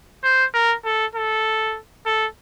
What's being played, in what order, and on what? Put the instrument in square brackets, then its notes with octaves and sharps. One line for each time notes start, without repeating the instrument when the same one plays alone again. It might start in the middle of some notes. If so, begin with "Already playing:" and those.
[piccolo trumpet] C5
A#4
A4
A4
A4